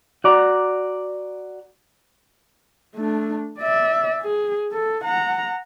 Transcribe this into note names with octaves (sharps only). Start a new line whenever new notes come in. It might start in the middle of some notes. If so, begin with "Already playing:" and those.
F#4 D5 A#5
A3 D4
D5 E5
G#4
A4
F#5 A#5